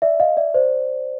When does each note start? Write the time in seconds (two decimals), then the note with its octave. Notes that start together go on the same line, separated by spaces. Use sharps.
0.02 D5 E5
0.20 D#5 F5
0.37 D5 E5
0.54 C5 D5